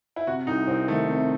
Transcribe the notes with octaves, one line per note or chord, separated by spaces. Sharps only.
E4
C3 F#4
C2 D#4
C2 C4
D#3 A3
C3